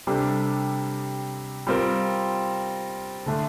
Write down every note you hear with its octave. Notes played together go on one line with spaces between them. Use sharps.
C3 G3 D4 A4
G3 C4 F4 A#4
D3 A3 D4